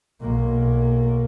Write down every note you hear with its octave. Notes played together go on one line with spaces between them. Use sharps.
B1 A#3